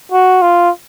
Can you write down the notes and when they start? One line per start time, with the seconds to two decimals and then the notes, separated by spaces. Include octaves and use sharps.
0.12 F#4
0.42 F4